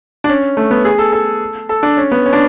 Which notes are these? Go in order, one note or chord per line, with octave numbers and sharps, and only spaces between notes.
D4
C#4
A3
B3
G#4
A4
A4
A4
D4
C#4
B3
C#4
D4